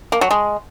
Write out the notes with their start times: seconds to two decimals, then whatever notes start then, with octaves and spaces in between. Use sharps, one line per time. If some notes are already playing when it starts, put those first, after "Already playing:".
0.12 A#3
0.21 F#3
0.31 G#3